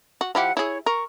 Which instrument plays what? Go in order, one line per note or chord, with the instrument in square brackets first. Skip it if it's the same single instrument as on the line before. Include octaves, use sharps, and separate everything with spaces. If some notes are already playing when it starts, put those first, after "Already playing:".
[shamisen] F#4
[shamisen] F3 E4 G4 [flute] F#5
[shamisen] E4 G#4 [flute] C#5
[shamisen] A#4 [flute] C#6